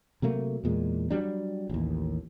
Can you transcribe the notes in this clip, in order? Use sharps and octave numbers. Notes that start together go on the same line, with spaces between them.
C3 F#3 A3 A#3
E2 A#2 G#3
F#3 G3 D4
A1 D#2